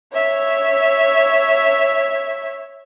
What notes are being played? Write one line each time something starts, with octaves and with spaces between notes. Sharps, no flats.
C#5 E5